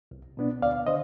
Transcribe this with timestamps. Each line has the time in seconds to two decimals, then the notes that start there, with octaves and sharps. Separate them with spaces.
0.11 C2
0.37 B2 B3 D4
0.62 D2 D5 F5
0.87 D3 C5 D#5